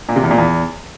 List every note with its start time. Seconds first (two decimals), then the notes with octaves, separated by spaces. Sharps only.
0.09 A#2
0.16 C3
0.23 E2
0.31 A#2
0.38 E2